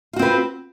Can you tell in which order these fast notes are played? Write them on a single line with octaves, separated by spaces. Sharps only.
F4 F#4 C4 B4